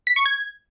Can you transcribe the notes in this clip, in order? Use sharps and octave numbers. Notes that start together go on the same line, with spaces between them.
B6
C#6
G#6